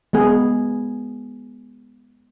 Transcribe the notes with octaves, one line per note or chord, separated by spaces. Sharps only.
G#3 B3 G#4